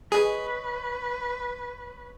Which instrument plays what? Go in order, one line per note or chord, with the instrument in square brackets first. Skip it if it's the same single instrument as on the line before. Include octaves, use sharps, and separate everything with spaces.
[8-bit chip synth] G#4 [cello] B4 [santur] C#5 D#5 C#6